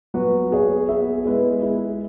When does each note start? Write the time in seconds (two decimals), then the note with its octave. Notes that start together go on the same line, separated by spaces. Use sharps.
0.14 F#3 B3 F#4 B4
0.51 B3 G#4 C#5
0.88 B3 G#4 B4 E5
1.25 G#3 B3 E4 B4
1.62 G#3 E4 G#4